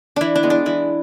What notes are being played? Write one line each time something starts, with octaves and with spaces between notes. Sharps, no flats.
E3 D4 E4
D4
G#3 B3
D4
E3 E4